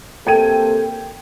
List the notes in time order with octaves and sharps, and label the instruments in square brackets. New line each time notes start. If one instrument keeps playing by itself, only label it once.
[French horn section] C3 A#3 A4 [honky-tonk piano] G5 G#6 D#7